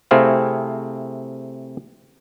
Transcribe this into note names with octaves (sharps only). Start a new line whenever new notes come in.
C3 A3 C4 E4 G#4 F5